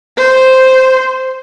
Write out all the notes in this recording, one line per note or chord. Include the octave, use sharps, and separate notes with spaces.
C5